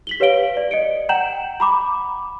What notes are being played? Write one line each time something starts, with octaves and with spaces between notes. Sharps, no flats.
B6 F#7 G7
G4 B4 C#5 F5 D7 G7
D5
D#5 C#7 D7
F#5 G5 A#5 G6 E7 F#7
A#5 B5 D6